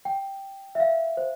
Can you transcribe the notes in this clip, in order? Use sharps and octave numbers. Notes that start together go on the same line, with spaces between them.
G5
E5
F5
C5